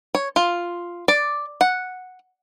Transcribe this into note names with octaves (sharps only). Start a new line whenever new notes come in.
C#5
F4
D5
F#5